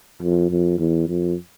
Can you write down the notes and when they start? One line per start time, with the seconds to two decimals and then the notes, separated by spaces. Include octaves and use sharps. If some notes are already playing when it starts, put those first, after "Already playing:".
0.21 F2
0.51 F2
0.79 E2
1.08 F2